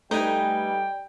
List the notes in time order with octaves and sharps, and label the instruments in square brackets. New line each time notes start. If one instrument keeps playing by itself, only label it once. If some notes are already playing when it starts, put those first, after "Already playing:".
[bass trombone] G3 [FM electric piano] A3 B4 G#5 [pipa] D#4 [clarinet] G5